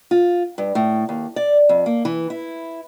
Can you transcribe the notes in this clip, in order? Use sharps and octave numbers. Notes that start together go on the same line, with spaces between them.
F4
G2
A2
D#2
D5
F2
A#3
E3
E4